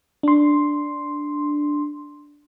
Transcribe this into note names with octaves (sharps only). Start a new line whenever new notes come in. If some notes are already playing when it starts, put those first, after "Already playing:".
D4 C6